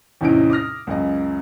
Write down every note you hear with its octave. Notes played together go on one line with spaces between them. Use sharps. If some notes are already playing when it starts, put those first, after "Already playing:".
E2 A2 C3 C#4 D#4 D7
D6 D#6 F6 A#6
C#2 F#2 D#5